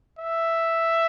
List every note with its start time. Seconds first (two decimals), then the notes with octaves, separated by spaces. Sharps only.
0.19 E5